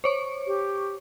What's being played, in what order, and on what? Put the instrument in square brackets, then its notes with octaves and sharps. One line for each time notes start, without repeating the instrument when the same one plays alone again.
[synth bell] C5 C#5 C#6
[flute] G4